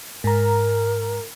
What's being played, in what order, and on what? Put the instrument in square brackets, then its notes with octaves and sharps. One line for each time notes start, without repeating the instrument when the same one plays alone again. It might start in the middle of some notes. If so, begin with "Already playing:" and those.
[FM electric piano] G#2 A#5 [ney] A#4